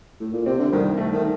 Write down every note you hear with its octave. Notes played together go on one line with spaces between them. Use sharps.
A2
A#2
C3 C4
D3
C2 D#3
A3
D#3